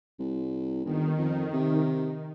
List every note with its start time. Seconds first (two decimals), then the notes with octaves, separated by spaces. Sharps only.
0.19 C2
0.85 G1 D#3
1.18 F2
1.53 C3